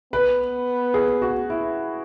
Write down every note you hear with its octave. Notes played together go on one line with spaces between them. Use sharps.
B3 B4
G#4
F#4
E4